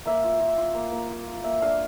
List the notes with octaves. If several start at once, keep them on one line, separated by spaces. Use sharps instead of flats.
A#3 E5
F4
F4
F4
A#3
A#3
F4
F4
A#3 E5
D4 F5